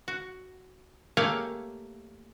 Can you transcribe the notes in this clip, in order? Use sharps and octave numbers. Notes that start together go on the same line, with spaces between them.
F#4
A3 A#3 G4 C#5 F5 G#5